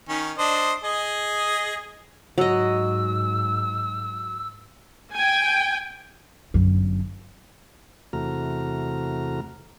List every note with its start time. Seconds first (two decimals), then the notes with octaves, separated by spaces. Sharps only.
0.09 D#3 C#4
0.38 D4 C5 D#5
0.84 G#4 D#5
2.38 G#2 F#3 D#5 E6
5.15 G5 G#5
6.54 G1 F#2
8.13 E2 C3 A3 F#4 A#5 F6